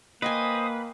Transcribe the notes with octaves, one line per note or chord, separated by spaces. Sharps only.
A#3 B4 C5 D#5 G5 G#5 D#6